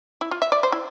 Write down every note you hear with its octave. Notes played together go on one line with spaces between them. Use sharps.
E4
F4
E5
D5
C5
E4